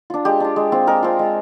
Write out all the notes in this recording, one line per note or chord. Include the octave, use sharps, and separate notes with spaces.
D4 F4
G#3 G4
D4 F4
G#3
C4 F4
G#3 A#4
C4 F4
G#3